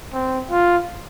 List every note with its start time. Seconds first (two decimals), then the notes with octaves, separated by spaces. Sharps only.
0.13 C4
0.51 F4